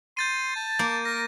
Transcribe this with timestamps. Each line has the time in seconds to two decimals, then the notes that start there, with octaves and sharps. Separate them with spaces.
0.17 C6 G6 A6 D#7
0.56 A5
0.79 A#3 G6
1.05 A#4 A#6